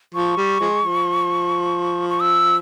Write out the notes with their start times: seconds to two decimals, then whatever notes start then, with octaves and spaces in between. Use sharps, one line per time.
0.14 F3 C#6
0.37 G3
0.61 F3 G#3
0.83 F3
2.10 C#6
2.20 E6